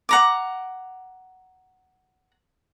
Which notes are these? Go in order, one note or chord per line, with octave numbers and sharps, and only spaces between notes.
F#5 A#5 D6